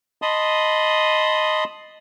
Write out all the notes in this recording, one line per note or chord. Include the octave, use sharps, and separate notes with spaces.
D#5 A5 B5 C6 D#6